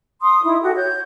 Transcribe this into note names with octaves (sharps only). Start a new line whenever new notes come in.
C6 D#6
D#4 E4 D#6
F#4 G4 A4
C#5 G6